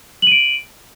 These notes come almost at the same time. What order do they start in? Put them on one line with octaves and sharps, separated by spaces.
F#7 D#7 D7